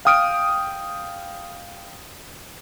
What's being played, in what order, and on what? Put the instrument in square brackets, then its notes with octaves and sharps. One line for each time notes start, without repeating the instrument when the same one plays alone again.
[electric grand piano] F5 G5 D#6 F6 D7